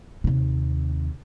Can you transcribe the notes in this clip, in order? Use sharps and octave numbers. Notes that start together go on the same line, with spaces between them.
D#2 C3